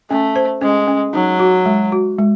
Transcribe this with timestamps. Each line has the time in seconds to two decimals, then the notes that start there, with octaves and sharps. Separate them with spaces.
0.10 A3 C#4
0.36 C5
0.62 G#3 C#4
0.87 C#4
1.13 F#3 D#4
1.39 F#4
1.66 G#3
1.92 F#4
2.19 G#3